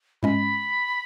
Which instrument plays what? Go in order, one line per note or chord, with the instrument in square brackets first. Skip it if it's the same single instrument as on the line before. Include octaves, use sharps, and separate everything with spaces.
[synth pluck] G#2 G#3 C#4 [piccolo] B5